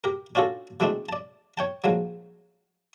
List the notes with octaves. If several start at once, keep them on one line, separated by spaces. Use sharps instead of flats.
G4 A#4
C#4 D4 F4 F#4 A4
B2 E3 G#3 A3 C4 D4
D5 A5
C#5 G5 A5
A#1 G#2 F3 F#3